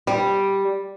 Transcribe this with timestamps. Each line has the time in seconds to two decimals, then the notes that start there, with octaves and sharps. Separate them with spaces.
0.07 G3